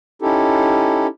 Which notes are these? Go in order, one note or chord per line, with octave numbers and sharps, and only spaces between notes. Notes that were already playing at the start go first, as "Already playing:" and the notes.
C#4 D#4 E4 G4 A4